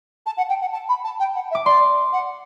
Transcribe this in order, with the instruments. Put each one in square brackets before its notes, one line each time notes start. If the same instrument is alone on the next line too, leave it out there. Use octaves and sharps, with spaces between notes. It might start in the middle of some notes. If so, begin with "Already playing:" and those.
[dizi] A5
F#5
G5
F#5
A5
B5
A5
G5
F#5
E5
[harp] D6
[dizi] D5 [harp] C6
[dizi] F#5